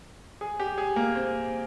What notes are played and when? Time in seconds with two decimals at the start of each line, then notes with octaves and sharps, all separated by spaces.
0.41 G#4
0.60 G4
0.78 G#4
0.96 A#3
1.15 C4